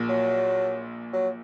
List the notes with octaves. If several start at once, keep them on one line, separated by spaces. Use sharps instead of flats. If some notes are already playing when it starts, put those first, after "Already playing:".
Already playing: A#1 A#2
F#3
F#3